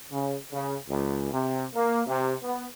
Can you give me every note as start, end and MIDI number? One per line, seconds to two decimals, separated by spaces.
0.11 0.36 49
0.52 0.75 49
0.89 1.27 37
1.31 1.65 48
1.74 2.01 58
2.07 2.34 48
2.43 2.66 59